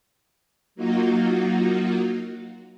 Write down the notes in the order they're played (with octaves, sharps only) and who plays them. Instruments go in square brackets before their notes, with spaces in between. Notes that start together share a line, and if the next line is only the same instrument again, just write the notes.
[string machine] F#3 A#3 D#4 F4 F#4